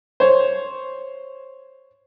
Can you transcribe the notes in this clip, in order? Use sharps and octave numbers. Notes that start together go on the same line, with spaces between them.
C5 C#5